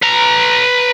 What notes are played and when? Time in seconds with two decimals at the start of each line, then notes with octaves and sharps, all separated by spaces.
0.02 B4 A#5